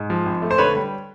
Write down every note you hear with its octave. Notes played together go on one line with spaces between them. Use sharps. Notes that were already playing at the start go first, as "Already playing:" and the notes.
Already playing: G#2
F3
G#1
A3
C5
D3 B4 C#5
G3